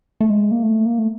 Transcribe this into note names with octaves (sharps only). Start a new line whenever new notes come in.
A3
G#3
A#3
A3
A#3
A3